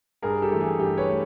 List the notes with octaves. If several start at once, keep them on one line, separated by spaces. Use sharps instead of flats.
G2 G#4 A#4
G4 A4
E3 A3
G#4
G2 G4
B4 C#5
A3